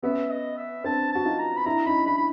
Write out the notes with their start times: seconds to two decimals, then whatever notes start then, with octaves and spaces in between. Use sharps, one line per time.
0.03 B3 C#4 E5
0.30 D#5
0.57 E5
0.84 C4 D4 A5
1.12 F#4 A5
1.25 D#4 F4
1.38 A#5
1.57 B5
1.66 D4 E4 A#5
1.86 C#4 D#4 B5
2.06 D4 E4 B5
2.17 B5